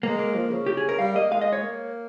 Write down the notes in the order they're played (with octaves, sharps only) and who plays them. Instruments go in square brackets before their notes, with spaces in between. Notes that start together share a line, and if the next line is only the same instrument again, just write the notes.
[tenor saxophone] G#3 [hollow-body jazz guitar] A#3
[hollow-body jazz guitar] A#3
[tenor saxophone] F3
C#3
[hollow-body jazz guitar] G4
G#4
A#4
[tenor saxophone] G3 [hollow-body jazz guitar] F5
[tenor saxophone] A#3 [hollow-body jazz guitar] D#5
[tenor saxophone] G#3 [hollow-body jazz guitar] F5
[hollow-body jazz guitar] D#5
C#5
[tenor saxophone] A#3